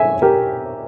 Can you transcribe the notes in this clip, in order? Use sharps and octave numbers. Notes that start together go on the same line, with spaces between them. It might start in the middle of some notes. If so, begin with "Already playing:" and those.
Already playing: E5 G#5
G4 A#4